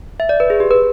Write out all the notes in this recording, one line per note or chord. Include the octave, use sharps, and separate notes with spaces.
E5
D5
B4
G#4
G4
B4